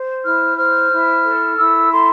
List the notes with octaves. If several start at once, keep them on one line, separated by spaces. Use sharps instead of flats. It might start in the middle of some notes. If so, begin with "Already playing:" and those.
Already playing: C5
E4 F6
C5 F6
E4
A4
E4 E6
A4 C6